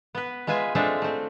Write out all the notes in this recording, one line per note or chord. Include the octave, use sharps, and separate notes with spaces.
B3 B4
G#3 F4 B4 E5 G#5
G#3 C4 D4 F4 A4 E5
A3 C4